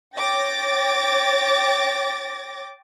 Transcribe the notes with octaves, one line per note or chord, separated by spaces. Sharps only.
C#5 G5 D6 A6 A#6